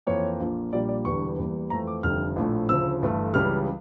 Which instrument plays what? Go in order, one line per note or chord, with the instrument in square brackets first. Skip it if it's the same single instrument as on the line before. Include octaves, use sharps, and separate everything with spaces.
[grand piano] F2 E3 A#3 C#5
A#1 A#2 F3 A#3
A#1 A#2 G3 A#3 D5
D5
E1 E2 D3 G3 C#6
E2 E3 G3 A#3
F2 E3 A3 A#5
D6
F1 F2 D3 G3 F6
A#1 A2 F3 A3
D2 C#3 F3 E6
G1 G2 E3 A3
C#2 C#3 E3 G3 F6